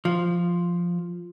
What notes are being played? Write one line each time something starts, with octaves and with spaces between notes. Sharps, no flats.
F3